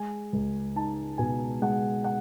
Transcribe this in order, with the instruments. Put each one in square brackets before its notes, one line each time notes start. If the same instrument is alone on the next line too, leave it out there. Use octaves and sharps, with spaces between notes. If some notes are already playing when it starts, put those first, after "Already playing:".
Already playing: [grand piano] G#3 G#5
C#2
D#4 A5
B2 G#5
G#3 F#5
F#5